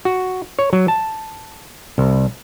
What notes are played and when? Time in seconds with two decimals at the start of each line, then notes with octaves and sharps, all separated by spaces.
0.05 F#4
0.59 C#5
0.73 F#3
0.88 A5
1.98 C2